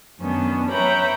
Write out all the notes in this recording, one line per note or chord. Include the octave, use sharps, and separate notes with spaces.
F#2 D#3 B3 C#4 D4
B4 C#5 E5 G5 A#5 B5